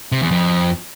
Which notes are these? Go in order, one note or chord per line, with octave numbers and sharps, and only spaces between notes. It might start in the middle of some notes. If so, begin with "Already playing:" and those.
C3
E2
F2